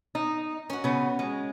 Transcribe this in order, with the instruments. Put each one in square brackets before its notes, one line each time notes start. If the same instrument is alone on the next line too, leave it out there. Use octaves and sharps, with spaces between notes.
[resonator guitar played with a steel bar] D#4
[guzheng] C#4 F#4
[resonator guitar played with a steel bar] C#3 B3
G#3